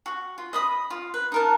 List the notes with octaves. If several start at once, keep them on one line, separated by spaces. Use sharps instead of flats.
F#4
F4
D#5 B5 D#6
F4
B4
D#4 A#4 A5